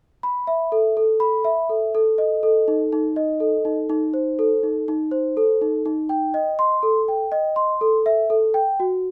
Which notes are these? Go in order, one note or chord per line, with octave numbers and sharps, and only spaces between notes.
B5
E5
A4
A4
B5
E5
A4
A4
D#5
A4
D#4
D#4
D#5
A4
D#4
D#4
C5
A4
D#4
D#4
C5
A4
D#4
D#4
G5
D#5
C6
A4
G5
D#5
C6
A4
E5
A4
G5
F#4